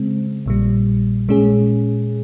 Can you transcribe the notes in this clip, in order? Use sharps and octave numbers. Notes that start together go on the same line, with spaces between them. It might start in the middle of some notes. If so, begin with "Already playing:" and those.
Already playing: C#3 G#3 C4
A#1 A#2 G3
A#2 G#3 C#4 G#4